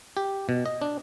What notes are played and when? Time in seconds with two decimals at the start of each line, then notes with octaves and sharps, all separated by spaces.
0.17 G4
0.49 B2
0.66 D#5
0.82 D4